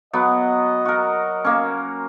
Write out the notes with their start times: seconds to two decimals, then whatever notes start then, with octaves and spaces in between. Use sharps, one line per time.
0.13 F#3 B3 D#5
0.85 F#4 A#4
1.45 A#3 C#4